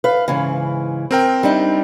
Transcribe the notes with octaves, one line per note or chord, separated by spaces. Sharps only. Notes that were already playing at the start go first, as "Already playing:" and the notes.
B4 F5
G#2 C#3 E3
C4 A#4 G5
G3 D4 D#4